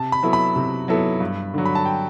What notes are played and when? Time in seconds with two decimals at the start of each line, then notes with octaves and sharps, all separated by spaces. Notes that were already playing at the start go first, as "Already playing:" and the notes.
Already playing: C3 A5
0.12 B5
0.23 F#3 B3 E4 A4
0.33 B5
0.56 C3
0.88 F#3 B3 E4 A4
1.20 G2
1.54 D3 F#3
1.65 B5
1.75 A5
1.85 G5